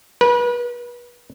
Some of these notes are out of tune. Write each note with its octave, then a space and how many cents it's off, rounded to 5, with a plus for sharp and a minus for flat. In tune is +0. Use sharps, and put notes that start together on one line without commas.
B4 -35